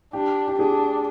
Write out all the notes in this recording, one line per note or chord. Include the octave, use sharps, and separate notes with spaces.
D4 G4
G4
D4 G#4